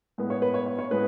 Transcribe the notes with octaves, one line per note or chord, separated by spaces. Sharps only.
A2 G#3 B3
C#5
B4
C#5
C#5
C#5
A2 G#3 B3 B4